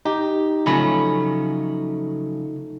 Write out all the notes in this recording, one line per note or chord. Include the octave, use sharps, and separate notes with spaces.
D#4 G4
C#3 F3 F#3 A3 C#4 B5